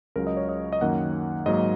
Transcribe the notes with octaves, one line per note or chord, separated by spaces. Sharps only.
C#2 C#3 F#3 A#4
D#5
C#5
D#5
D#5
F#2 D#3 A#3 F#5
G#2 F#3 A#3 D#5